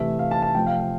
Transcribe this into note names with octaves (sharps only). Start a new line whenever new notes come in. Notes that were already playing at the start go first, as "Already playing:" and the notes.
Already playing: C3 E3 A3 E5
F5
A5
A5
C3 F3 A3 G5
F5
F5